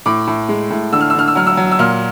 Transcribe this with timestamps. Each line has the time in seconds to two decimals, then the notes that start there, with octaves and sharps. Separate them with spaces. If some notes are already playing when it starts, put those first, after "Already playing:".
0.06 A2 D6
0.27 A2
0.49 G#3
0.70 A2
0.92 D3 E6
1.01 F6
1.10 E6
1.14 D3 F6
1.28 E6
1.35 F#3 F6
1.47 E6
1.57 F#3
1.71 E6
1.79 A#2 F6